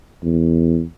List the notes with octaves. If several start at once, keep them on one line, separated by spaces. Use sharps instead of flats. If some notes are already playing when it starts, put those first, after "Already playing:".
E2